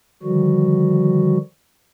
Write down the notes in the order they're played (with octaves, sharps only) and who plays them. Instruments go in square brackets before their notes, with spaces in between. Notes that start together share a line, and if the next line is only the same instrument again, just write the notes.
[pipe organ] D3 D#3 F3 G3 F#4